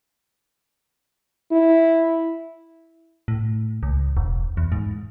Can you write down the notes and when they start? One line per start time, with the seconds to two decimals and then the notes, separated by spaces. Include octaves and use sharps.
1.51 E4
3.28 A2
3.83 C#2
4.17 E1
4.57 E2
4.72 G#2